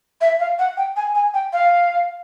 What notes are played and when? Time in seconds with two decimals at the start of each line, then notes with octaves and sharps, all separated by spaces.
0.21 E5
0.40 F5
0.59 F#5
0.77 G5
0.96 G#5
1.15 G#5
1.34 G5
1.53 F5